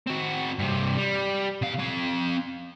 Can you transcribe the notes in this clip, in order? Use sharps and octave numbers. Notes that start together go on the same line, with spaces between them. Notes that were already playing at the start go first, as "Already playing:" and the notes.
C4 F#4
G2 C3
G3
B2 F5
C4 F5